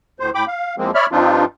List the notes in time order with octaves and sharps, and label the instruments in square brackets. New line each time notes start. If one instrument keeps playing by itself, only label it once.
[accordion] D2 A2 C5
A2 G5 B5 D6
F5
E2 F3 G#3 A#3 C4
C#5 D5 E5 B5 F6
G2 F3 C4 D4 D#4 F4